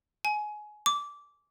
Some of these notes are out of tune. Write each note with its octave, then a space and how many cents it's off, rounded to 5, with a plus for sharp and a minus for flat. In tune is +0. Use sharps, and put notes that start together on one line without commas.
G#5 +20
D6 -15